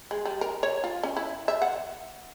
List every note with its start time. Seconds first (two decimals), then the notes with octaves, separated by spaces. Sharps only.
0.11 G#3
0.25 G3
0.41 A#4
0.63 C#5
0.84 F4
1.03 C#4
1.17 E4
1.48 E5
1.62 F#5